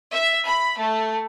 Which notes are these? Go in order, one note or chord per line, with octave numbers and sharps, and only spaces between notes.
E5
B5
A3